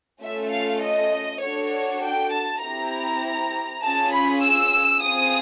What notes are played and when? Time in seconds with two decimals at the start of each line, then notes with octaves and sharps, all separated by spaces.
0.21 A3 C#4 F4 A4 E5
0.52 F5
0.82 D#5
1.42 D4 F#4 A4 C#5
2.02 G5
2.32 A5
2.62 C4 E4 G4 A#5
3.83 C#4 F4 G#4 A5
4.13 B5
4.43 E6
5.03 C4 F4 G#4 D#6